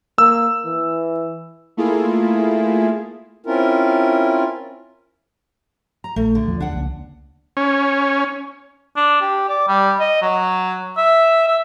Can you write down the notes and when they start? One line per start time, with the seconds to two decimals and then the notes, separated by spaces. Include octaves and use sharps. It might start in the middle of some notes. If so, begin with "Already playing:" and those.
0.18 A#3 E6
0.65 E3
1.77 A3 A#3 E4 F4 G#4
3.46 C4 C#4 E4 F4 A#4
6.04 A#5
6.16 A#1 A3
6.35 D3
6.48 E2 F3
6.60 D2 D4 F#5
6.74 C#2 A#3
7.57 C#4
8.97 D4
9.21 G4
9.49 D5
9.68 G3
10.00 D#5
10.22 F#3
10.98 E5
11.48 E5